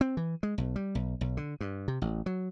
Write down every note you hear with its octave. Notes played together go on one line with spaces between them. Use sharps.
C4
E3
G#3
B1
G3
B1
B1
D3
G2
C3
A1
F#3